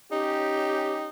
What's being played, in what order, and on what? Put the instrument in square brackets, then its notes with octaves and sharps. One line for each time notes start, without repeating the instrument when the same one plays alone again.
[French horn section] C#4 G4 [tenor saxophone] D#4